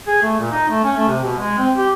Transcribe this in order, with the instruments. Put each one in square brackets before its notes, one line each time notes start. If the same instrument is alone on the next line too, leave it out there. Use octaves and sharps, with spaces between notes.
[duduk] G#4
A3
A#2
D#4
A3
C#4
A3
C3
B2
G#3
C4
G4